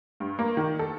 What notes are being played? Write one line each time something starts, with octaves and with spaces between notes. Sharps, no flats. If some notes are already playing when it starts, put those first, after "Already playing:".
G2
A#3
D#3
A4